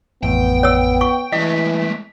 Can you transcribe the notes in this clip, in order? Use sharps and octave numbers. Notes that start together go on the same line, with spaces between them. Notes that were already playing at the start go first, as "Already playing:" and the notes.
A1 F2 A2 B3 G5
C#5 E6
C#6
E3 G#3 A3 D#5 B6